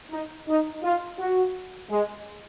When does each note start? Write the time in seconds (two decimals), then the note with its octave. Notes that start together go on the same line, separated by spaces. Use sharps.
0.11 D#4
0.48 D#4
0.83 F4
1.19 F#4
1.90 G#3